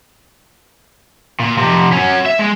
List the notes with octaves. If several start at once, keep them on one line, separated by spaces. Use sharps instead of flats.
A#2
F2 C3
F#3 C#4
E5
G#3